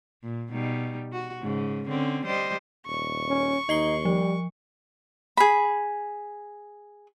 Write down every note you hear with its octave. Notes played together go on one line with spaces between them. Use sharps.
A#2
B2 G3 D#4
F#4
G#2 C#3
D3 C4 C#4
G3 C5 D#5
D#1 C#6
C#4
D#2 D#4 D#5 C7 G7
F3 G3
G#4 B5